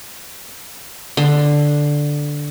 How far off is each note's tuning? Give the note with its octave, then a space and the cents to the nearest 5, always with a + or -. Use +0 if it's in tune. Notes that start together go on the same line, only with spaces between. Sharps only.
D3 +0 C6 +0